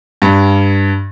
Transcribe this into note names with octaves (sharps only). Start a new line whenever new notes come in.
G2